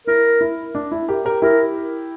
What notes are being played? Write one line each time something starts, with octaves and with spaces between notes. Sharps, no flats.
E4 A#4
E4
D4
E4
G4 A#4
G4 A#4
E4 G4 A#4